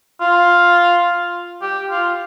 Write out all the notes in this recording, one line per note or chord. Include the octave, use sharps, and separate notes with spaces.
F4
G4
F4